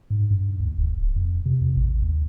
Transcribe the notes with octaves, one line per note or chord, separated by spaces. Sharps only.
G#2
G2
D2
E1
D1
F2
C3
E2
A1
D#2